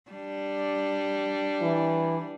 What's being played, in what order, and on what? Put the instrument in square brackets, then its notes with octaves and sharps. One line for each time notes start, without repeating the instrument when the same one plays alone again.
[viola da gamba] G3 D4
[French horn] E3